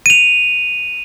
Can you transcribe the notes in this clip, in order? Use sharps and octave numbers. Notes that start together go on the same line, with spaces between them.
D#7 F7